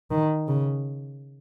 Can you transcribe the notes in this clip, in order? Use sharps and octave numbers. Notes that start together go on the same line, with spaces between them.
D#3
C#3